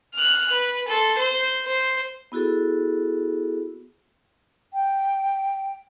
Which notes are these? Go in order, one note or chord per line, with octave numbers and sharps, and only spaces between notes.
F6 F#6
B4
A4 C6
C5
C5
B3 E4 F#4 G#4 A4
G5